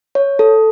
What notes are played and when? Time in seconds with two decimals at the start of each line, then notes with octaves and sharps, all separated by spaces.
0.15 C#5
0.39 A4